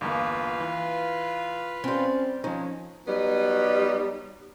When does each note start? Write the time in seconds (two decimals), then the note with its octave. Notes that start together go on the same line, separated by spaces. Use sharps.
0.01 G1 E2 A#3 F4 B4 F5
0.60 E3
1.84 G3 C4 C#4
2.44 F3 C#4 D#4
3.07 F#3 G3 B3 D#4